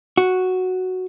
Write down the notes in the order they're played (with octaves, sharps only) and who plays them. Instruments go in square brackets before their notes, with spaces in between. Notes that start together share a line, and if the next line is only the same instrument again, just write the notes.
[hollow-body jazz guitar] F#4